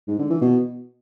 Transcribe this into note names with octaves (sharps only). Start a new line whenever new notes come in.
G#2
D3
E3
B2